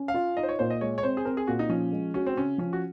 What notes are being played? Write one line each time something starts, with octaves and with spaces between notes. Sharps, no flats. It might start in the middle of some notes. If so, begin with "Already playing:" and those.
Already playing: C#4
F5
F4
D#4 D#5
C5
C#5
A#2 C5
D#5
G#3 C#5
C#5
C4 C5
G#4
C4 A#4
G#4
A#2 F#4
D#4
F3 C#4
G#3
C#4 F#4
C4
C#3 C#4
F3 C#4
F#4